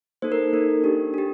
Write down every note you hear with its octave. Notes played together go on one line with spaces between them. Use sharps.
A#3 D#4 A4 C5
A#4
A#3 D#4 A4
D4 G4
D4 G4